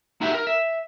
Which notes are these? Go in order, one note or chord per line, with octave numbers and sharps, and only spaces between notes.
D#4 E4 F#4 G4 E5
A#4
E5